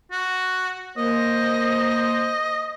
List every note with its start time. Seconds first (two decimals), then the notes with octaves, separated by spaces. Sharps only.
0.12 F#4
0.98 A#3 C5 D#5